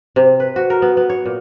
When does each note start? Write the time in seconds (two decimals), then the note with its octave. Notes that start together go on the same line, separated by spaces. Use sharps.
0.16 C3
0.40 B4
0.56 F#4
0.70 A#4
0.82 B3
0.97 B3
1.10 C#5
1.26 A#2